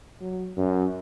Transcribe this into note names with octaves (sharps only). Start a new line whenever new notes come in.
F#3
F#2